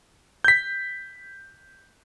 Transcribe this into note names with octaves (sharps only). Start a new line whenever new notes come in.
G6 B6